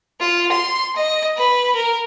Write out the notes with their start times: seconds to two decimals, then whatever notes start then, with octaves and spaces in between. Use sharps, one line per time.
0.20 F4
0.52 C6
0.96 D#5
1.37 B4
1.75 A#4